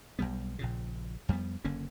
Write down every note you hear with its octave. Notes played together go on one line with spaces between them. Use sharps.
B1 E2 G3 B3
A#1 A#2 C#3
F2 G3 A3 B3
F#1 D3 A#3 C#4